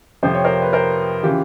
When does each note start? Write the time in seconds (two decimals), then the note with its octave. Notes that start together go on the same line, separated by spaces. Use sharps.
0.23 F2 C3 F3 C5
0.34 C#5
0.44 A#4 C5
0.62 B4
0.73 A#4 C5
1.23 C#3 E3 F4 G4